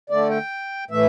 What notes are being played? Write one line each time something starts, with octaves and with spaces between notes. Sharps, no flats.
D3 A3 D5
G5
A2 E3 A3 E5